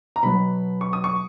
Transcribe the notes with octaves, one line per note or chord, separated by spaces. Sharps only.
A#5
B2 F#3 B3 B5
C#6
D#6
C#6